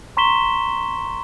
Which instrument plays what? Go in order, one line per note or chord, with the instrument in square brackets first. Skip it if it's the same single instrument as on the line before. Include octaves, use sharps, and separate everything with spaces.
[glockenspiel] A#5 C6 C#6 B6 E7 G7